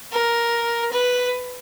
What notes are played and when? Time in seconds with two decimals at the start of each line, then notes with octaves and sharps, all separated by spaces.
0.12 A#4
0.92 B4